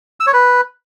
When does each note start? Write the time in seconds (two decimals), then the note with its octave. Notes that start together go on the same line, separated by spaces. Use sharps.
0.20 E6
0.27 C#5
0.33 B4